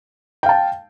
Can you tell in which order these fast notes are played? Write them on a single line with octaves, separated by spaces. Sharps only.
G5 F5 A5